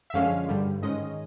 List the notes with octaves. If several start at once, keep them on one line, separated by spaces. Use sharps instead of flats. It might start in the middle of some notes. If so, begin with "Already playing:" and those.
E5
F#2 D3 F3 G#3 C#4 F5
G2 D3 G3
G#2 D#3 G#3 C#4 D#5